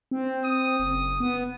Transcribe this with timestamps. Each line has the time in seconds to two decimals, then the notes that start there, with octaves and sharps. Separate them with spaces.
0.11 C4
0.45 D#6
0.80 F#1
1.20 B3